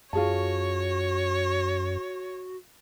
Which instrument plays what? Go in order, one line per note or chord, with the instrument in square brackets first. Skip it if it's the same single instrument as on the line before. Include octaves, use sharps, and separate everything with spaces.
[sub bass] F#2 [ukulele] F4 G#4 A5 [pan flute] F#4 [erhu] C#5